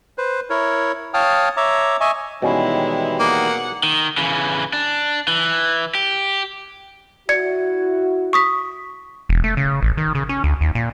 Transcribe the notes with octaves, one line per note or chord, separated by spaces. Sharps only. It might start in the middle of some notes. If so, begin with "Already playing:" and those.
B4 C5
E4 A#4 C#5
C#5 F5 G5 A5 D#6 F6
C#5 E5 A#5 D6
D#5 E5 G#5 C#6
B2 D#3 E3 G3 G#3 C#4 E4
A#3 G#4 F#5
D#3
C#3 E3
D4
E3
G4
E4 F#4 D5 G#6 C#7
C#6 D#6 B6
E1
A3
C#3
A1
D#3
C#3
C#4
D2
D#2
A#2